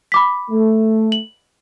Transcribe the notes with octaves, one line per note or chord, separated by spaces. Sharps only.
B5 D6 B6
A3
F#7